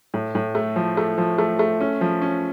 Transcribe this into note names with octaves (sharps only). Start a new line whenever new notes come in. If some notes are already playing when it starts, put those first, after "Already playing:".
A2
A2
A3
F3
A3
F3
A3
A3
C#4
F3
C#4